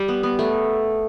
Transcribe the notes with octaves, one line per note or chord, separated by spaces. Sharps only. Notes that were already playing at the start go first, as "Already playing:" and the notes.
Already playing: G3
B3
B3
A3